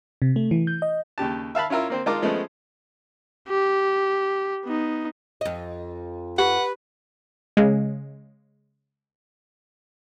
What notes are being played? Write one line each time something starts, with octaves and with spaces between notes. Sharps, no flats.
C3
A3
E3
G6
D#5
D#2 C#3 G4 A5
E5 F5 A5 B5
C#4 E4 F4 A#4 E5
A#3 C4 C5
G#3 D#4 F4 A#4 A5 D6
F3 G#3 A3 B3 C#4
G4
B3 D#4
F2 D#5
G4 B4 F#5
C#3 G#3